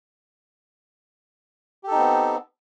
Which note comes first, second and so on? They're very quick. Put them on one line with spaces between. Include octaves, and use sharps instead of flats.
G4 A4 D#4 C4 B3